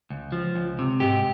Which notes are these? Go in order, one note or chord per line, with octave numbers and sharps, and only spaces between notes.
C#2
F3
C#2
C3
G#2 G4